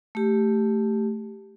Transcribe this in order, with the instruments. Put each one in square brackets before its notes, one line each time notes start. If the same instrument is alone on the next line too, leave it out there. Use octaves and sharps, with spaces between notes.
[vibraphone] A3 G4